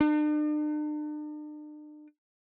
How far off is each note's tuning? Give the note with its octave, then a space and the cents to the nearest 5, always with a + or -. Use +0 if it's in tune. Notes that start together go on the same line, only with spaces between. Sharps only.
D4 +45